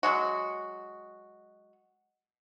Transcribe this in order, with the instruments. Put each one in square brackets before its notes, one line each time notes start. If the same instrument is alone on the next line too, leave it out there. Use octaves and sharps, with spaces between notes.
[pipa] F#3 G#3 F#4